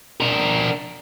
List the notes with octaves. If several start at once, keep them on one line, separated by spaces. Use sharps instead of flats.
D4 A#4